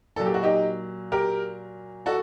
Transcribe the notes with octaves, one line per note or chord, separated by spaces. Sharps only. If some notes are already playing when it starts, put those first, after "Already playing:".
A#2 F#3 A4
G4
F#4
D#4 G4
G4 A#4
F#4 A4